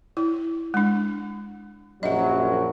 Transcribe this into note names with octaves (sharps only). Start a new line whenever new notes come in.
E4
G#3 D4
A#1 F#2 F#3 D#5 E5